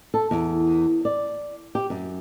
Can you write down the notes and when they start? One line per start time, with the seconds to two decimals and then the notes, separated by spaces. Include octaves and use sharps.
0.14 A4
0.31 E2
1.05 D5
1.75 G4
1.90 F#2